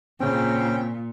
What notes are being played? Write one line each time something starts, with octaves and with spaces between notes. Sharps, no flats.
A#2 C#3 C4 C#4 G5